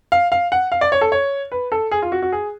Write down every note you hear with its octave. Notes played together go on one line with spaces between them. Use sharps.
F5
F5
F#5
F5
D5
C#5
A4
C#5
B4
A4
G#4
F4
F#4
F#4
G#4